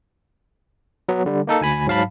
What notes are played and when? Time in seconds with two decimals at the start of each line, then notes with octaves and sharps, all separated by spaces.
1.09 F#3 B3
1.26 D3 G3
1.47 A#3 D#4 A4
1.61 D2 G#5 B5
1.87 G#2 F#3 F5 A5 B5